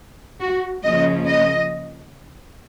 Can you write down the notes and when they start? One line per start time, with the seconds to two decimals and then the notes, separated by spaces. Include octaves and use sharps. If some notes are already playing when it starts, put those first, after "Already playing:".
0.41 F#4
0.83 C#3 F3 A#3 C#4 D#5
1.25 D#5